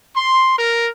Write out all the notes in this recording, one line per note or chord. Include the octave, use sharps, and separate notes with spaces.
C6
A#4